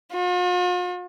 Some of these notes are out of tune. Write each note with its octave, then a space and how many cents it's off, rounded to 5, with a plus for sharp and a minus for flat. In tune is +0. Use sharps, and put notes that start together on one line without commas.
F4 +45